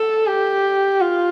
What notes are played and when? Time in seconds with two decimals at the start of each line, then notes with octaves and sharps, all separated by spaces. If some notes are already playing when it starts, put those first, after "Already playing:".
Already playing: A4
0.27 G4
1.01 F4